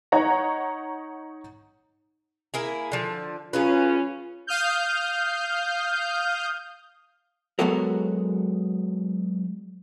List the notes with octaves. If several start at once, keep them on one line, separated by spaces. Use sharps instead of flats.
D#4 C#5 F#5 A#5
A#3 E4 G#4
D3 F3
F#3 C#4 F4 G#4 B4
F5 D#6 F6 G6
F#3 G#3 B3 F#4 A4 A#4